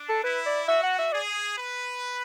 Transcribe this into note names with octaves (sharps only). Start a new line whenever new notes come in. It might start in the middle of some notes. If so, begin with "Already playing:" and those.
Already playing: D4
A4
E4 B4
D5
F#4 E5
F#5
E5
G#4 D5
B4